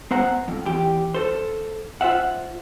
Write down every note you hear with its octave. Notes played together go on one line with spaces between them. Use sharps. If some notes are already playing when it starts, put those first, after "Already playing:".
B3 C5 F#5 A#5
F2
E2 G4
A4 C5
F4 C5 E5 F#5